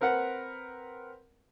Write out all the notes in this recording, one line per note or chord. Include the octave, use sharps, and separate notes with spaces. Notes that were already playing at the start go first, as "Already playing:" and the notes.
C4 A#4 B4 F#5